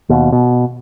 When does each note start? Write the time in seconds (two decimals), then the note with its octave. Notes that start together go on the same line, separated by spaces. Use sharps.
0.09 D#2 B2
0.32 B2